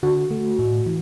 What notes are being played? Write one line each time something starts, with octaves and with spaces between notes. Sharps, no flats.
D3 F#4
A3
A2
E3